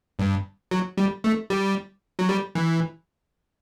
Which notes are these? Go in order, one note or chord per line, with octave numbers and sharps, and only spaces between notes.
G2
F#3
G3
A3
G3
F#3
G3
E3